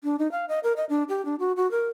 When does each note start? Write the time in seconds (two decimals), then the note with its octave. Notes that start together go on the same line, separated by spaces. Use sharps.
0.04 D4
0.19 D#4
0.32 F5
0.49 D#5
0.63 A#4
0.76 D#5
0.89 D4
1.09 G4
1.25 D4
1.40 F#4
1.56 F#4
1.71 A#4